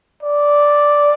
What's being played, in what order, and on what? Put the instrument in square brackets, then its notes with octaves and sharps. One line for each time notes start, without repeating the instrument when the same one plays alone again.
[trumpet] D5